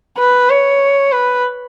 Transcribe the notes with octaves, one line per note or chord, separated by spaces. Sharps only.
B4
C#5
B4